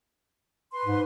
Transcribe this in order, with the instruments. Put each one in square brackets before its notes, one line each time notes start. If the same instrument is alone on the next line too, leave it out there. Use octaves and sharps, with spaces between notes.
[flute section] B4 C6
[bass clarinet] G#2